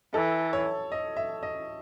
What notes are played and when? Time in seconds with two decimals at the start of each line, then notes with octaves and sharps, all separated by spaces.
0.14 E3 A4
0.53 C#5
0.92 D#5
1.17 E5
1.43 D#5